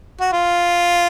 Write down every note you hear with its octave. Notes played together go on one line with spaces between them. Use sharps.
F#4
F4